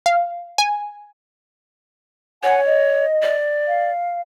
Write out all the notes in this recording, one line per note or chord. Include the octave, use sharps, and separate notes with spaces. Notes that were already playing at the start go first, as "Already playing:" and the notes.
F5
G#5
C#5 F#5 G#5
D#5
D5
F5